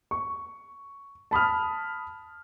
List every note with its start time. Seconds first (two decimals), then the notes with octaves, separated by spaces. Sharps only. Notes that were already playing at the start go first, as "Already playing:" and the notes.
0.11 C#6
1.31 A5 B5 D#6 F6